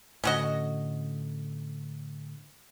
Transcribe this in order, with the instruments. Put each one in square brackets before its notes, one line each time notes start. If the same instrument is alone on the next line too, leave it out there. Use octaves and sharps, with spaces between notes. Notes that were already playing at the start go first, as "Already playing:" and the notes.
[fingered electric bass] A2 D3 [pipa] C#4 F#4 D#5